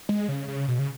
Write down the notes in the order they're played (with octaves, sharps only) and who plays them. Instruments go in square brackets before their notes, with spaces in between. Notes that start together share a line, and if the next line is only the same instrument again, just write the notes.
[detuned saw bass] G#3
C#3
C#3
B2
C#3